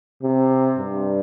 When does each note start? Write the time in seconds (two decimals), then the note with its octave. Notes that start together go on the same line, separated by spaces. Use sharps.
0.22 C3
0.78 G2